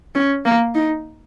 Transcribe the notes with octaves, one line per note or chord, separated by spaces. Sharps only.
C#4
A#3
D#4